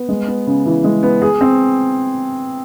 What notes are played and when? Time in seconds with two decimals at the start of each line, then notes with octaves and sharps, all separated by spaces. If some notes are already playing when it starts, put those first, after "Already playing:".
Already playing: B3
0.09 G#3
0.27 B3
0.47 C#3
0.66 E3
0.84 G#3
1.03 B3
1.22 G#4
1.41 C4